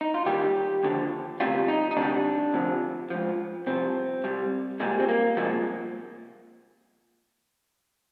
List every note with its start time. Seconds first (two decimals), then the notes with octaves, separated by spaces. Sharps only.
0.01 D#4
0.14 F4
0.26 D#2 D#3 G3 G4
0.83 D#2 D3 F3
1.40 D2 C3 G3 F4
1.68 D#4
1.91 D#4
1.97 D2 C3 G3 D4
2.53 D2 C3 F3
3.10 G#2 F3
3.67 C2 C3 F3 C4
4.24 C2 C3 G3
4.80 C2 A#2 G3 G#3
5.00 C4
5.08 A#3
5.37 C2 A#2 F3 G#3